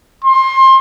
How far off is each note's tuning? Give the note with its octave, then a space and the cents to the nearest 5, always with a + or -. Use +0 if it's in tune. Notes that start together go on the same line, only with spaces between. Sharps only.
C6 +25